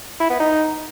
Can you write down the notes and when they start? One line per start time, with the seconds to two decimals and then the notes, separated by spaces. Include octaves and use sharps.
0.20 E4
0.30 B3
0.40 D#4